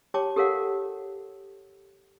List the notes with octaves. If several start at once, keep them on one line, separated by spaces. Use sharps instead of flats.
G4 C#5 G5 A5 D6
G4 A4 A#4 C#5 F5 F#5